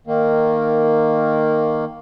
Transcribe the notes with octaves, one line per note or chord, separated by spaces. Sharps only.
D#3 A#3